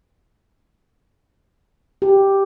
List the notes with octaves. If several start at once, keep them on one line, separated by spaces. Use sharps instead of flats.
G4